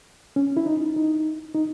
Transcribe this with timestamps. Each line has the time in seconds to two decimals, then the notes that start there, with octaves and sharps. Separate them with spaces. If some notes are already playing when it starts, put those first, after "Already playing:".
0.36 C#4
0.57 E4
0.66 D#4
0.96 D#4
1.55 D#4